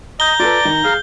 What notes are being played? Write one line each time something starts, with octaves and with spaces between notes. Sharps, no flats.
D#5 A#5 G6 G7
F4 A4 B4 D5
D#3
G#4 F5